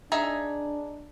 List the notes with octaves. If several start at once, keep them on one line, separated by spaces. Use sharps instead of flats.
D4 D#4 G#4 E5